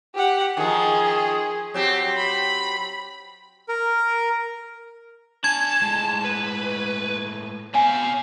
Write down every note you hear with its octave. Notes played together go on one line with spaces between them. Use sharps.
G4 F#5
D#3 F3 G#4
F#3 C4 G4
B5
A#4
D4 G#5 A5 G#6
A2 G#3
B4
B2 C4 C#5 F5 G#5